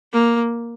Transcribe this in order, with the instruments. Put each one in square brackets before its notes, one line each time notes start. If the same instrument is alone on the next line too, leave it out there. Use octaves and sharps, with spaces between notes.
[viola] A#3